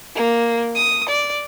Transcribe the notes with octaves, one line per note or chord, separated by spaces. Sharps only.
A#3
D#6
D5